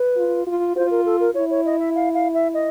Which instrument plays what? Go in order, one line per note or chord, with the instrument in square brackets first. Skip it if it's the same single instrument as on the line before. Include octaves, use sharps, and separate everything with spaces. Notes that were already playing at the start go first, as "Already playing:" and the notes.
Already playing: [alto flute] B4
[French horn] F4
F4
[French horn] F4 [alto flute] C5
[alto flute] A#4
A4
A#4
[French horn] E4 [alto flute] C#5
[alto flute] C#5
D#5
E5
F5
F5
E5
D#5